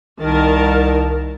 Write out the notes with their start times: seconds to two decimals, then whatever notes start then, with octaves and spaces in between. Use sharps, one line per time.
0.20 C2 D#3 A#4 A5